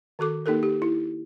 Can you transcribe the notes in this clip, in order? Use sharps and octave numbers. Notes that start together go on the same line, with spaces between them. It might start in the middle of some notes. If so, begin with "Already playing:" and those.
D#3 F#4 A4 D6
A#3 D#4 G4 A4 A#4
G4
E4